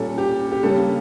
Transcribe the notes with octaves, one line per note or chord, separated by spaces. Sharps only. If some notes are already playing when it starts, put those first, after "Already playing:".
Already playing: A#2 G3 C#4 A4
G4
G4
C#3 G3 A#3 C#4 A4